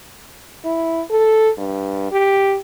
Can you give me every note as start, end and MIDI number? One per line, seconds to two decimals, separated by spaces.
0.65 1.02 64
1.11 1.50 69
1.58 2.07 43
2.11 2.57 67